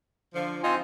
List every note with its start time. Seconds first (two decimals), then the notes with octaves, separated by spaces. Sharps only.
0.35 D3 F3
0.63 C4 D#4 F4 G#5